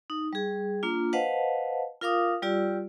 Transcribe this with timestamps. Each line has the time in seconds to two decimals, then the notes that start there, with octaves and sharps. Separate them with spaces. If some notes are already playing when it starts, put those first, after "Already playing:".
0.10 D#4
0.33 G3 G#4
0.83 A#3 D4 F4
1.13 B4 C5 D#5 F5 F#5 A5
2.02 F4 A#4 F5 D6 D#6
2.42 G3 F4 G4 D5 E6